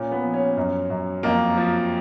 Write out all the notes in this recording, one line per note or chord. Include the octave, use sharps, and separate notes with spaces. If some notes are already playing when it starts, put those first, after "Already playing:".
Already playing: A#2 C#4
B3
F3
C#4
F#2
F#2
F2 A#3
F3